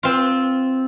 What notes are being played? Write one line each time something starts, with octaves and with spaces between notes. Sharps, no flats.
C4 F4